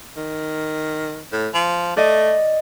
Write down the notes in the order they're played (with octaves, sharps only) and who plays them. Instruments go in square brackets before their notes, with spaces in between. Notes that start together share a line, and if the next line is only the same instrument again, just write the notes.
[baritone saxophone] D#3
A2
F3
[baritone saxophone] A3 [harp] D5 D#5